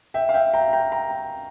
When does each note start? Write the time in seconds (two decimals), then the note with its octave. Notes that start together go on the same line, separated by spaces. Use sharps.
0.14 E5 G5
0.29 F5
0.34 E5 G5
0.54 G5 A#5
0.73 G5 A#5
0.92 G5 A#5